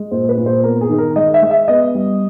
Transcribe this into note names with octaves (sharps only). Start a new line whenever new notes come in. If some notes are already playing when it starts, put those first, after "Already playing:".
Already playing: G#3
A#2 C5
B4
A#2
C5
B3 A#4
G#4
D#3
A#4
G#3 D#5
E5
G#3
E5
B3 D#5
G3